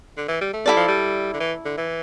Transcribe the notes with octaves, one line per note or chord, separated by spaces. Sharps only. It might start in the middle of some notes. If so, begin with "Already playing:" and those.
D3
E3
G3
A3
G3 E4 A4 D5
F3
G3
D3
E3
D3
E3